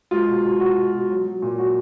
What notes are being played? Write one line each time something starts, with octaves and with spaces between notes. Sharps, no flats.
G#3 F4
B2
B2
B2 F#4
B2
B2
F#3
F#3
A#2
F#3 F#4